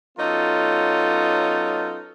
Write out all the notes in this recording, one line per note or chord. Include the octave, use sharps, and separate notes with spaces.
F#3 B3 C#4 D#4 F4 A4